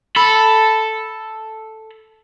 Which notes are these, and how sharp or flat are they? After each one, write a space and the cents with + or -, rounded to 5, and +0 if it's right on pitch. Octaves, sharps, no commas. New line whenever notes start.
A4 +0 B5 +0